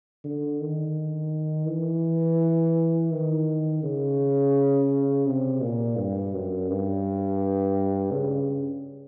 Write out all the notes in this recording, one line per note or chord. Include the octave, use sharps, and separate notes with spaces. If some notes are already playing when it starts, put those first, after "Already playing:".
D3
D#3
E3
D#3
C#3
C3
A#2
G2
F#2
G2
C#3